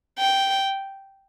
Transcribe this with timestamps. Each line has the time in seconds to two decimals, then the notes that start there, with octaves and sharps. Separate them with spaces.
0.19 G5